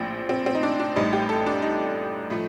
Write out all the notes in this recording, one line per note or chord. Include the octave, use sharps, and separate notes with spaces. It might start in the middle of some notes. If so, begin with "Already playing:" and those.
Already playing: A#1 A2 F3 C4
C4
C4
D#4
D4
D4
A1 A2 G3 D#4
G4
A4
D4
D#4
A2 F3 A3